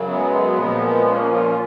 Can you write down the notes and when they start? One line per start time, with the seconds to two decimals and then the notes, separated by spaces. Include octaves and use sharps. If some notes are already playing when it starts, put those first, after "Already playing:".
Already playing: F#2 C#3 F#3
0.08 G#3 B3
0.58 A#2 F3
1.07 A#3 C#4
1.31 C#4 F4